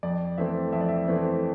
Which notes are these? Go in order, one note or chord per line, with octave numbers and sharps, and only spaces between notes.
F2 D5
E3 A3 C4 E5
F2 E5
D5
E5
E3 A3 C4